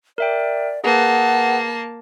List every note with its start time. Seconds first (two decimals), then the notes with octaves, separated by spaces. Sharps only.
0.18 A#4 D5 E5 G5
0.84 A#3 G#4 B4 F#5 A5